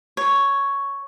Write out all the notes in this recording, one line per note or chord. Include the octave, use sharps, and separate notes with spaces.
C#5